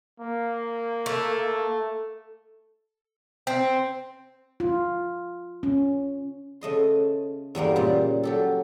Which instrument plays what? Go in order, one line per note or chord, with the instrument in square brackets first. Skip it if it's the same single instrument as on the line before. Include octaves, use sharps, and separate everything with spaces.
[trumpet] A#3
[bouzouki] A3
C4
[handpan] F4
C#4
[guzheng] C#3 A3 D#5 C6
E2 G2 G3 A#3
A#2 C#3 G3
F#3 G4 A4